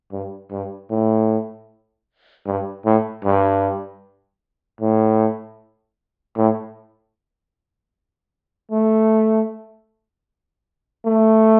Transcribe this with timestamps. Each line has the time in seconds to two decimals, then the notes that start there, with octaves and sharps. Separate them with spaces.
0.12 G2
0.51 G2
0.91 A2
2.47 G2
2.85 A2
3.25 G2
4.81 A2
6.37 A2
8.71 A3
11.06 A3